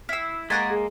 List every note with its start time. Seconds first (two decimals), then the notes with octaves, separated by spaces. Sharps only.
0.09 E4 E6 F6 C7
0.50 G#3 A#3 A#4 F#5 G#5 C#6 A6 B6
0.70 G#4